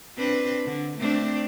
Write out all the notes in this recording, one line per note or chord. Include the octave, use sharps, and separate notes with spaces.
C4 D4 B4
D3
A3 C4 D4